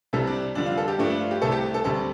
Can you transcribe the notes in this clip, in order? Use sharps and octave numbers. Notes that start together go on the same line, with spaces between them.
C2 C3 G3 A4
D4
F2 D3 G3 D4
F4
A4
G4
G2 F3 A3 D4
D4
F4
G4
C2 C3 A3 A4
G4
A4
D2 C3 G3 A4